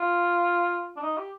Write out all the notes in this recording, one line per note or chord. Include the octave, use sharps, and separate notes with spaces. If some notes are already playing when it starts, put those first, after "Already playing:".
Already playing: F4
D4
D#4
G4